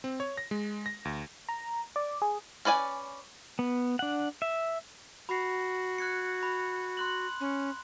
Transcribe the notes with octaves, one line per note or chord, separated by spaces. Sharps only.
C4
C#5
A#6
G#3
A#6
D2
A#5
D5
G#4
C#4 B4 D5 G#5
B3
D4 F#5
E5
F#4 B5 C7
F#6 G#6 C#7
B5
C6 F#6 F#7
C#4